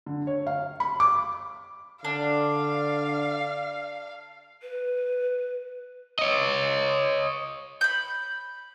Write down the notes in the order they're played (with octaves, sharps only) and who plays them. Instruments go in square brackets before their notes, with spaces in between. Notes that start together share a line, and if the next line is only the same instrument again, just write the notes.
[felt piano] D3
C#5
F5
B5
D6
[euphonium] D3 [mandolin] D4 [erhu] F5
[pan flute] B4
[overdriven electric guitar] C#5 D#5
[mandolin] B5 G6